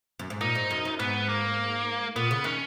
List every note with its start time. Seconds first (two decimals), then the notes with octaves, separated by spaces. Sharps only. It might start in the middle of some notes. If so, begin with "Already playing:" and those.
0.19 F#2
0.30 G#2
0.41 A#2 D#4
0.55 G#2
0.71 F#2
0.85 F#2
1.00 G#2 B3
1.29 A#3
2.16 A#2 B3
2.31 C#3
2.44 D#3 C#4